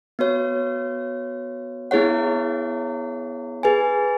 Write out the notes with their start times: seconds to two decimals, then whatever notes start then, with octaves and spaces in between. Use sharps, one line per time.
0.19 B3 F#4 C#5
1.91 B3 E4 G#4 C#5 F#5
3.63 G#4 B4 G#5